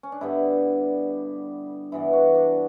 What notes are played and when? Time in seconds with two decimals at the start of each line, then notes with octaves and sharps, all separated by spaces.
0.03 C#4
0.12 D4
0.21 G2 D3 G3 B3 E4
1.92 G2 E3 B3 E4
2.13 F#4
2.35 D4